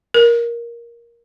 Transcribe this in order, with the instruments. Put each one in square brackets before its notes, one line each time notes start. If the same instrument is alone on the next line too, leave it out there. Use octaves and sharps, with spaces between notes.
[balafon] A#4